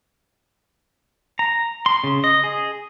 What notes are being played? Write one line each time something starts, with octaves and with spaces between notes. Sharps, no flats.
A#5
C6
C#3
D#5
G#4